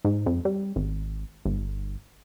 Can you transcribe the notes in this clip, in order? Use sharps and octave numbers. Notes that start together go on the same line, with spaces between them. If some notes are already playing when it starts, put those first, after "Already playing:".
G#2
F2
G3
G#1
G1